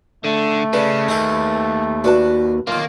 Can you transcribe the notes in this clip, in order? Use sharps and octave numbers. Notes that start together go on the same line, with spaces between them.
D3 A3
C#3 D4 B4
D#2 D#4 G#4 A4
D4 F#4 B4 A5
B1 D#3 A#3 F4